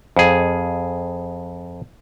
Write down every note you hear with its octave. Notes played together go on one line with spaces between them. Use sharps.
F2 G#4